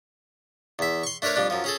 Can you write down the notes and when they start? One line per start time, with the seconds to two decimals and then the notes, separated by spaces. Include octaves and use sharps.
0.79 E2 E5
1.03 C6 C#6
1.22 A3 D4 A#4 B4 C#5
1.36 F2 G3 D4
1.50 F#2 F3
1.64 C#4 G#4 A4